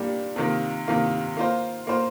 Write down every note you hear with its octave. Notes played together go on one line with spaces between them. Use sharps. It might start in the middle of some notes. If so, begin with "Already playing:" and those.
Already playing: A#2 G3 A#3 D4 G4
C3 D#3 A#3 F4
C3 D#3 A#3 F4
A#3 F4 C5
A#3 F4 C5